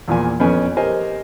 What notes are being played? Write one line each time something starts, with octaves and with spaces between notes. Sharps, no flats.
E2 A#2 F3 G#5
F2 B3 C#4 G#5
G4 A#4 C5 D#5 G#5